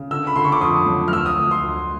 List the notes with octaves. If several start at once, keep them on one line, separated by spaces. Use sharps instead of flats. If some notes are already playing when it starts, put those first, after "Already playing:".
Already playing: C#3
D3 E6
B5
D3 C6
C#6
D6
F2 D#6
F#3
F6
D2 E6
D#6
D2
C6
D2